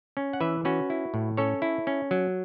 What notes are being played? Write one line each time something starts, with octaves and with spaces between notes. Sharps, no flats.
C#4
F#5
E3 B4 E5
C#4 F#4 B4
E4
A2
C#4 A4 C#5
E4
C#4
F#3